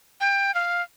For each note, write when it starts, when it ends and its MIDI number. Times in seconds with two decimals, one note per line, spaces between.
0.21 0.54 79
0.54 0.82 77